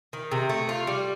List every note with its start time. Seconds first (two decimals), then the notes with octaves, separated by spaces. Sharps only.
0.13 D#3
0.32 C3
0.49 A3
0.69 F4
0.87 G3